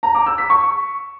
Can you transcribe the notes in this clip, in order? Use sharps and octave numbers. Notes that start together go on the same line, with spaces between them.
A#5
D6
E6
B6
C#6